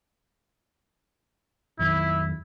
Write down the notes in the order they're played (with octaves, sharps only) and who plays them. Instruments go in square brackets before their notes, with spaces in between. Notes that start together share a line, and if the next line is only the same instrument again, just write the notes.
[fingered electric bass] F2 D#3 F#3 [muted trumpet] E4